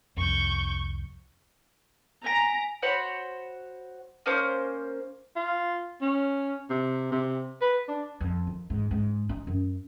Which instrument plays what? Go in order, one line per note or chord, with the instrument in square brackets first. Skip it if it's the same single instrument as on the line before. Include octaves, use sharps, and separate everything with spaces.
[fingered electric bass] C2 F2 [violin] C#6 G6
[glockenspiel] G#5 B6 D7 [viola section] A#5
[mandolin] F#4 C5 C#5 B5
A#3 C#4 C5 D6
[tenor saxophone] F4
C#4
C3
C3
B4
D4
[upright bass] F2
D#3
G#2
G#2
D#4
F#2